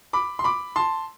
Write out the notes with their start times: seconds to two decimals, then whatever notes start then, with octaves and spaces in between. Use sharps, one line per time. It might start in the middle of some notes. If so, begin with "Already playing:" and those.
0.13 B5 D6
0.39 C6
0.44 B5 D6
0.76 A5 C6